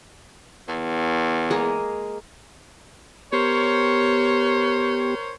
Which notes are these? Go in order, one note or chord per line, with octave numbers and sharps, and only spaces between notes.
E2
G#3 A#3 G#4
B3 G4 A#4 C5 C#5